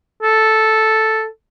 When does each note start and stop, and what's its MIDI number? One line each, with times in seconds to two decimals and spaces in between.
0.23 1.26 69